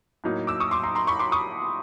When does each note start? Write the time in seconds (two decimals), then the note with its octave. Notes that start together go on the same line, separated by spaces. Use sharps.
0.24 A2 F#3 A#3 D#4
0.47 D6 E6
0.60 C#6 D#6
0.71 C6 D6
0.83 A#5 C6
0.95 A#5 C6
1.07 B5 C#6
1.19 C6 D6
1.32 C#6 D#6